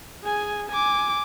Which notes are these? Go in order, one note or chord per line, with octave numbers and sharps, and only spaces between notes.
G#4 G#5
G#5 D6